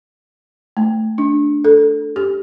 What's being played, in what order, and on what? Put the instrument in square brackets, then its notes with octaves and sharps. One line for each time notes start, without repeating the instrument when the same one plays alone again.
[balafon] A3
D4
A4
G4